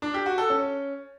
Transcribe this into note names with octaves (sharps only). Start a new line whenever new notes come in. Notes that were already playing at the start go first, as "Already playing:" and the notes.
D4
G4
F#4
A4
C#4